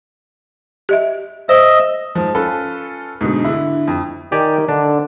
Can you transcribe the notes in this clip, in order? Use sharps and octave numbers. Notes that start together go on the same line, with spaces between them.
G4 D#5 E5
C5 D#5 E5
G#2 F3
C#4 F4 A4 B4
G#2 B2 D3
D3 E4
F2
D#3 G4 D5 G#5
D3 D4